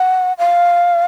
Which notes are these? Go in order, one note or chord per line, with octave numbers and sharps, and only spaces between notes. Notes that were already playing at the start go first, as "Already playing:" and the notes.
Already playing: F#5
F5